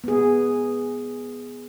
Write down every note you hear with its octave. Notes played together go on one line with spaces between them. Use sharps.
B3 G#4